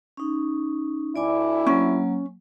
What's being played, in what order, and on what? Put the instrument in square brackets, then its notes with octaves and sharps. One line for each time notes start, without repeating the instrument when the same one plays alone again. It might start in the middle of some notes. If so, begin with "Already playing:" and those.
[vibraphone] C#4 D#4
[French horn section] D2 E4 [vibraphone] D5 G#5 D6
[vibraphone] F#3 A#3 [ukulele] C#4